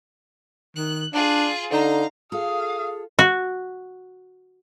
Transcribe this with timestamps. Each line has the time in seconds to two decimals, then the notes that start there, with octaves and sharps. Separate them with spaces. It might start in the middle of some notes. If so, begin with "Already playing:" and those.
0.76 D#3 F#6
1.13 D4 F4 G#4
1.72 D3 D#4 F5 A#5
2.32 F4 G#4 A4 F5 D#6
3.19 F#4